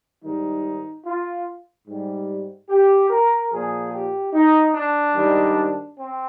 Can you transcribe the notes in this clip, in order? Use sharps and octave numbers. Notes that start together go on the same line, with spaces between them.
G#2 D#3 G3 D#4
F4
G#2 G3
G4
A#4
A#2 F3 G#4
G4
D#4
D4
G#2 D#3 G3
C4